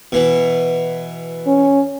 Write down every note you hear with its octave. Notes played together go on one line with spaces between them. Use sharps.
B2 E3
C#4